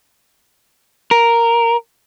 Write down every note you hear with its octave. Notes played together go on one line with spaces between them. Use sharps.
A#4